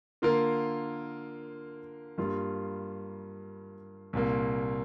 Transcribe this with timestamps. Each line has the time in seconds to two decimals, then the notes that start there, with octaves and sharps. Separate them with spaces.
0.22 D3 A#3 F4 A#4
2.18 G2 G3 A#3 F4
4.13 C2 A#2 A#3